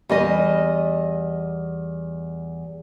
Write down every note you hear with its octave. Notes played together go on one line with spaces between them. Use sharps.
E2 G3 D#5